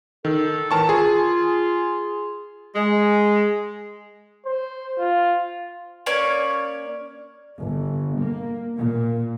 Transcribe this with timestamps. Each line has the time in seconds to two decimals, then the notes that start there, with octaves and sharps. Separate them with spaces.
0.25 D#3 A4
0.71 A2 D#3 E3 A#4 A5 C#6
0.89 F4 G#4
2.75 G#3
4.46 C5
4.99 F4
6.06 A#3 C#4 C#5 D5
7.58 G1
8.19 A#3
8.76 A#2